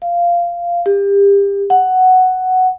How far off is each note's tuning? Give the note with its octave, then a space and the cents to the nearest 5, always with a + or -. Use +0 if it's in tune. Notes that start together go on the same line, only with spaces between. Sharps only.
F5 -10
G4 +30
F#5 +5